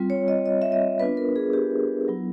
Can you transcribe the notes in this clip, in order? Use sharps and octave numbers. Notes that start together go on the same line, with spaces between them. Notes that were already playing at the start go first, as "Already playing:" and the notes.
Already playing: G3 C4 F4
C#5
D#5
D#5
E5
D#5
B3 D4 F4 B4
A#4
G#4
G4
F#3 B3 E4